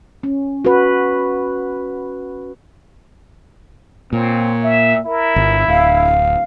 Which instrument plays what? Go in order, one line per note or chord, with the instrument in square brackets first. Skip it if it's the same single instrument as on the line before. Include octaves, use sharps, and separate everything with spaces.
[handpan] C#4
F#4 B4
[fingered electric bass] A#2 [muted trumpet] C4 [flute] C#5
[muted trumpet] E5
[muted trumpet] E4 [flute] A#4
[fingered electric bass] G1
[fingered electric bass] D1 [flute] F5